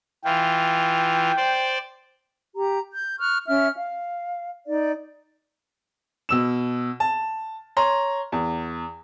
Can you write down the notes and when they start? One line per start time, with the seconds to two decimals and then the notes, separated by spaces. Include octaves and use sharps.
0.25 E3 F4 G5
1.37 C5 D5
2.55 G4 A#5
2.92 G6
3.18 C#6 F6 F#6
3.47 C#4 E5 F6
3.76 F5
4.66 D#4 D5
6.29 B2 E6 E7
7.00 A5
7.77 C#5 A#5 C6
8.32 E2